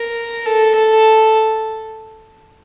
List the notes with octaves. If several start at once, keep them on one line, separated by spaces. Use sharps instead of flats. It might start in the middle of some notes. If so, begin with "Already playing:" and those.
Already playing: A#4
A4
A4